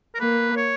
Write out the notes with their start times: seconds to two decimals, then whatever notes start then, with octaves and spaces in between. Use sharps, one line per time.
0.15 A#4
0.20 A#3 B4
0.56 C#5